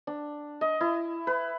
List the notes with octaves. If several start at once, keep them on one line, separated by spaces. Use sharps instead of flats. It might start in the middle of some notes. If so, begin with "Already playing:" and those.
D4
D#5
E4
B4